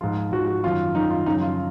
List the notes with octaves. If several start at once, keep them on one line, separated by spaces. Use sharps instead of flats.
G#2 F3 F4
G#2 F3 F#4
F#4
F#2 D#3 F4
F#2 D#3 D#4
F4
F#2 C#3 F3 D#4
F4